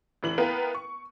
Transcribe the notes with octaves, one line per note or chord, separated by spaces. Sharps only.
F1 E3 F#7
B3 E4 A#4 B4 F5 G5
C#6